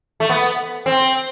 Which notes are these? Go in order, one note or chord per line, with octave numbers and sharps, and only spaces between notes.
A3
B3
C4